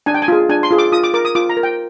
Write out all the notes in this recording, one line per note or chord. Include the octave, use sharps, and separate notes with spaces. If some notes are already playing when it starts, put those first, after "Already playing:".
D4 G#5
G5
G#5
F4 G#4
D4 G#5
C6
F4 G#4
D6
F4 D#6
D6
A#4 D6
D#6
F4 D6
A#5
A#4
G5